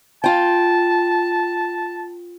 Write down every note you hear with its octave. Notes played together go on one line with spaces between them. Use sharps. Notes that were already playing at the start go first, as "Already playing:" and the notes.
F4 G5 A5